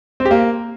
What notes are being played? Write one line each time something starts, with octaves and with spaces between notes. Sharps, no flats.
C4
G4
A#3